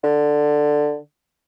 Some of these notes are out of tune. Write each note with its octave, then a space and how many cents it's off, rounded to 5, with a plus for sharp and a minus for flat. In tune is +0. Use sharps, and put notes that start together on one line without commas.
D3 +10